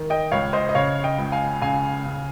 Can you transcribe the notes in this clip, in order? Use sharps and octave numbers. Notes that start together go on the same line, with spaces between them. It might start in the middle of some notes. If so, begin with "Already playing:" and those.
Already playing: D#3
D#5 G5
C#2 C#5 F5
C5 D#5
D#5
C#3 C#5 F5
D#5 G5
C#2
F5 G#5
C#3 F5 G#5
C#3